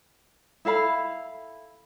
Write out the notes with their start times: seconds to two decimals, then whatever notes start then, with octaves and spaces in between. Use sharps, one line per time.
0.65 E4 A4 F5 B5